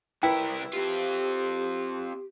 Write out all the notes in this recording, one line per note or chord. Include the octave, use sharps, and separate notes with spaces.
C2 E4 A#4 B4 G5
C4 F4 G4